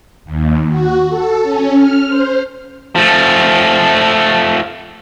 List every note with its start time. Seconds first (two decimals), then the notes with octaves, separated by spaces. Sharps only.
0.25 D#2
0.69 F#4
1.09 A4
1.42 C#4
1.74 F6
2.08 C5
2.96 F3 A3